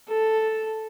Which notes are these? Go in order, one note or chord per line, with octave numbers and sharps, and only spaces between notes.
A4